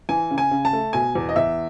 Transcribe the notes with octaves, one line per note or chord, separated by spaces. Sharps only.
E3 G#5
C#3
G#5
C#3
A5
A3
B2 G#5
E2
D#5
E2 E5